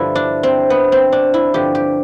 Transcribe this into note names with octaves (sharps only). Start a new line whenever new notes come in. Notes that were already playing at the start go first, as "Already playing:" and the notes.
Already playing: G2 D3 F3 E4
D4
C4
B3
C4
D4
E4
G2 D3 F3 G4
G4